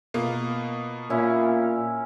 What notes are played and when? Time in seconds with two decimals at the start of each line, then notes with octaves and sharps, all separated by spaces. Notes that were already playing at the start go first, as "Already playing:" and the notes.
0.14 B2 A#3 F4
1.10 A#2 C#4 E4